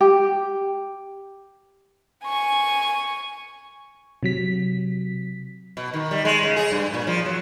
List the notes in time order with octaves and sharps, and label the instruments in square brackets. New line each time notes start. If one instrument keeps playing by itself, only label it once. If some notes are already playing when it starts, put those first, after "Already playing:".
[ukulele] G4
[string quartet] G#5 C#6
[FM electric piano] C3 F#3 B6
[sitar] B2
D#3
G3
G#3
C#3
G#4
G2
A#2
F3
F#3